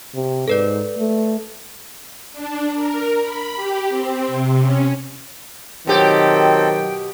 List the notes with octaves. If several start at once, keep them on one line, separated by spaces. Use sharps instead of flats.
C3
G#2 A4 B4 D5
A3
D4
A#4
B5
G4
C4
C3
C#4
B2 D#3 F#3 C4 G4 A4 G5